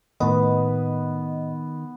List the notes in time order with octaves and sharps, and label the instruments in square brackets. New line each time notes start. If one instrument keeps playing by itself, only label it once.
[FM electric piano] A2 D#5 [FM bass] D#3 [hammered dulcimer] B3